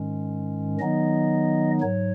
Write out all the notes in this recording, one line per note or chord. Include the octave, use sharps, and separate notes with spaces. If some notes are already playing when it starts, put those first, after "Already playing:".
Already playing: G#2 D#3 G#3 C#4
D#3 F#3 B3 D#4 D#5
G#2 F#3 C#5